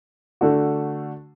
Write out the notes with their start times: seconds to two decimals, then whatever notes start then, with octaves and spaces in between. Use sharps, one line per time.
0.41 D3 A3 D4 F#4